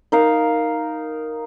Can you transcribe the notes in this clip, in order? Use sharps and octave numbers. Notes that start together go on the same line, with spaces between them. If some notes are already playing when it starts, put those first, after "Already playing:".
D#4 A#4 F5